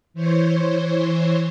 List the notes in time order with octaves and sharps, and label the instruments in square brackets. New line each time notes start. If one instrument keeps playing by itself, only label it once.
[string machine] E3 C5 C#5